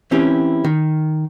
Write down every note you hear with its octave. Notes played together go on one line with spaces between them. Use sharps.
E3 C4 C#4 E4 G4
D#3